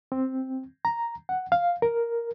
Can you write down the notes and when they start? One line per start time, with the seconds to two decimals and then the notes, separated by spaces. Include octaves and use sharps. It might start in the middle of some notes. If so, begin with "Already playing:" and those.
0.12 C4
0.85 A#5
1.29 F#5
1.52 F5
1.82 A#4